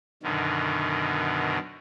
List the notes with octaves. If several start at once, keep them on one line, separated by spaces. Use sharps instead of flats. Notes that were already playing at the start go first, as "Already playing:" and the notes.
F#2 B2 D3 D#3